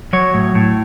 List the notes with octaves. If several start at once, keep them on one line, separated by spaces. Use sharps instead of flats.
F#3 C#5
A2
A2